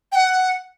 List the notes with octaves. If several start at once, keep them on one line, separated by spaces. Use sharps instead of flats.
G5
F#5